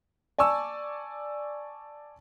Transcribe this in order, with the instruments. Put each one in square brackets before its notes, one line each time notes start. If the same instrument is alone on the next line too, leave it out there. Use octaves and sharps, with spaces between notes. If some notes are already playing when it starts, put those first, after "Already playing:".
[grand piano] D5 G#5 A5 C#6 E6